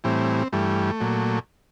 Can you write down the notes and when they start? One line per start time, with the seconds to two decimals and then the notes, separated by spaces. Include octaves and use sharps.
0.04 A2 E3 G3 C4
0.53 G2 E3 G3 A3
1.00 A#2 F#3